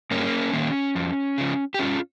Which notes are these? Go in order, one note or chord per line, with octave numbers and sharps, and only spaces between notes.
G2 A#3 C#4
D#3 A#3
F2
C#3 F3
G4
G2 C#4 F4